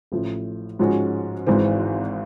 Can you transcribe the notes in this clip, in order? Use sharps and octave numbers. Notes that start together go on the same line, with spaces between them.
A1 A2 F3
G#2 F3 G#3 C#4 F#4
G#1 G#2 E3 G#3 C4